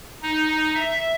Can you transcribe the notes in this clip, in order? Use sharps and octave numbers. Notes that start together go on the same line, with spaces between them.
D#4
E5